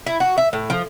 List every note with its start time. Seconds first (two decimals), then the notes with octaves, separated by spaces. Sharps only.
0.06 E4
0.20 F#4
0.38 E5
0.53 A2
0.70 F3